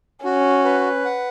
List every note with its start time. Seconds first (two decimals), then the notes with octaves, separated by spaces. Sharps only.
0.24 C#4 F#4
0.65 B4
1.05 F#5